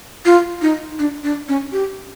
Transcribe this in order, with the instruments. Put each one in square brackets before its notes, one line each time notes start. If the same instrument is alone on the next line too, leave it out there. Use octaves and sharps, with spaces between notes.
[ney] F4
D#4
D4
D4
C#4
G4